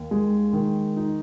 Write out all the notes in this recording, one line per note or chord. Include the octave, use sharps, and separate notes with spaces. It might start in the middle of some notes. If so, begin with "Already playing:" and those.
Already playing: D#2
G#3
D#3
D#4